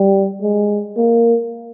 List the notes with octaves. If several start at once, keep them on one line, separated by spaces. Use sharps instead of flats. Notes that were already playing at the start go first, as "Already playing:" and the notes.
Already playing: G3
G#3
A#3